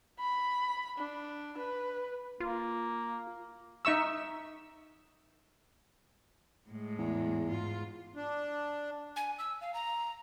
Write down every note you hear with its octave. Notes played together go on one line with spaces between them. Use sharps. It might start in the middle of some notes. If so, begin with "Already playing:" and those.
B5
D4
B4
A#3 F4
D#4 E5 C#6 E6
A2 G#3
E2
G#2 F4
D4
G#5
E6
F5
A#5